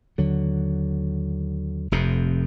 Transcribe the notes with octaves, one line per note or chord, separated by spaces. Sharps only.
D#2 D3 F#3
F1 F2 C3